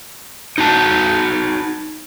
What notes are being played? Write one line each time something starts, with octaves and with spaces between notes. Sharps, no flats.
D#4 F#4 A5